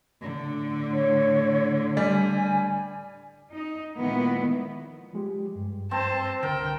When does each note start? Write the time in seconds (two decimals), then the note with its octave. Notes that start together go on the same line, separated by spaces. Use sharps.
0.23 A2 D3
0.93 C#5
1.97 G3 G#5
3.52 D#4
3.97 A#2 D#3 F3 G#3 B3 E4
5.13 F3 G#3 G4
5.55 G2
5.91 C4 C5 A5
6.43 C2 D3 A#4 G5